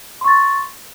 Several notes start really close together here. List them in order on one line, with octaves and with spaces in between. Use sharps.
C6 C#6 A6